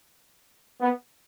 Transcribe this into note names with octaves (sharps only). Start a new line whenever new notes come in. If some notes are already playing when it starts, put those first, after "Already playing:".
B3